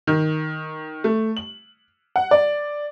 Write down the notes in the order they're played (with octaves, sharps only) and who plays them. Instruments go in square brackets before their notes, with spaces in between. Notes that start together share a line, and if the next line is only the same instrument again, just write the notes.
[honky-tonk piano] D#3
A3
F#7
F#5
D5